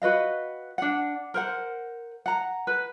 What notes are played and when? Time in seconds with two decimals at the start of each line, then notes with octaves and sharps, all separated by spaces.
0.02 F#4 B4 D#5 F5
0.78 D4 F#5
1.34 A#4 C5 F#5
2.26 F#5 A#5
2.67 B4